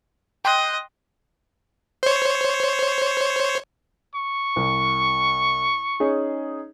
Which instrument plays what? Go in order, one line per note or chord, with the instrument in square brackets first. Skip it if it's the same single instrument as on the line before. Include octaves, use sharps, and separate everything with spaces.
[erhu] D#5 [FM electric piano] G5 C6 F#6
[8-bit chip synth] C5 C#5
[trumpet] C#6
[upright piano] C2
C#4 D#4 G#4